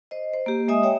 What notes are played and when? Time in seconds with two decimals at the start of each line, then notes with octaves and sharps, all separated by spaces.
0.11 C5 D#5
0.34 C5
0.46 A#3 G4
0.68 G#3 D#5 E5 G#5 D#6
0.83 C#5 E5 G5